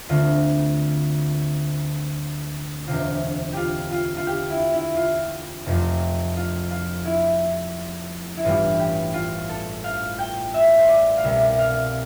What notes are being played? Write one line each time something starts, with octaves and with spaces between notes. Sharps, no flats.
D2 D3 A3 C4 F4
E1 D2 C3 F4
F4 G4
F4
F4
G4
E4
E4
F4
F1 F2 C3 F3 C4
F4
F4
E4
E4
A1 G2 E3 G3 B3 F4
G4
F4
A4
F5
G5
E5
C5
D5
F5
C2 B2 G3 E5
F5